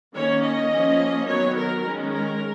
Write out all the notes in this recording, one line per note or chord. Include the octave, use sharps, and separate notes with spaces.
D#3 A#3 C#4 C#5
D#5
F3 A#3 C#4
D#3 F#3 B3 C#5
A#4
D#3 G#3 C#4
A#4